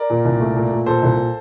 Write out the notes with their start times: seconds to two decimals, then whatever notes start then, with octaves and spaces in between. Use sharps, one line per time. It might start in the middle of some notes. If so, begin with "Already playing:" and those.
Already playing: A#4 D5
0.10 A#2
0.25 C2
0.40 A3
0.56 A#2
0.72 A#2
0.86 A#2 A4 C5
1.02 C2